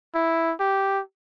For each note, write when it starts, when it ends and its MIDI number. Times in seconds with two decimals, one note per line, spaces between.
0.15 0.53 64
0.60 1.01 67